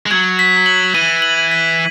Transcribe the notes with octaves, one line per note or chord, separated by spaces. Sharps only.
G#3
F#3 G#6
B6
F#7
E3 D#7
F#7
B6